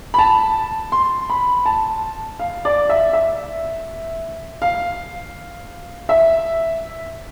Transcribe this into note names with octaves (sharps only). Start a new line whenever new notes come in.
B5
A5
C6
B5
A5
F5
D5
E5
E5
F5
E5